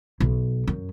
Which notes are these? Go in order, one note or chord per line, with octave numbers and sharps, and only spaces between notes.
B1
F#2